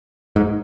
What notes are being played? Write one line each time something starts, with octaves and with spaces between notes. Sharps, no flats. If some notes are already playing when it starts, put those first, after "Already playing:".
G#2